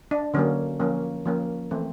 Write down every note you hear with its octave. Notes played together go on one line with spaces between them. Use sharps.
D4
D3 F#3 A#3 C#4
F3 A#3 C#4
F3 A#3 C#4
E3 A3 C4